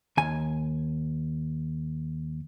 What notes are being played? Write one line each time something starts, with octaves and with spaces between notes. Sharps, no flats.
D#2 G#5